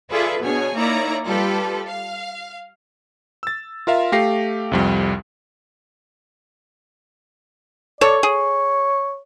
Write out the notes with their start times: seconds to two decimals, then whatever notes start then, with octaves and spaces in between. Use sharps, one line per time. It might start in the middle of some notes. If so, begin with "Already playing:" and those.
0.11 F4 G#4 A4 B4 D5 E5
0.44 B2 D4 G#4 C#5 G#5
0.76 A#3 D#4 E4 C#5 D5 A#5
1.26 G3 F4 G4 A4 B4
1.87 F5
3.43 E6 A6
3.87 F4 A#4 E5 F5
4.12 A3 G4 F5 A#6 C7
4.72 C2 F2 G3
8.01 A4 C#5 D5
8.23 G#4 C#5